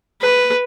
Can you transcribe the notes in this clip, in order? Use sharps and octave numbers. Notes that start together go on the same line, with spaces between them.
B4